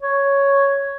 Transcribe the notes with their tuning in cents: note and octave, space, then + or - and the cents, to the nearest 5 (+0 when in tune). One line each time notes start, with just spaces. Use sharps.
C#5 +0